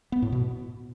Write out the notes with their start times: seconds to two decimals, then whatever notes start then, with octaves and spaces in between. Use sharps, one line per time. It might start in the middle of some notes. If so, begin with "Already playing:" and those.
0.12 B3
0.22 A2
0.32 B2